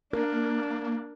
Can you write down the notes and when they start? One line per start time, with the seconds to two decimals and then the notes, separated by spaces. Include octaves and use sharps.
0.13 A#3 D4 A#4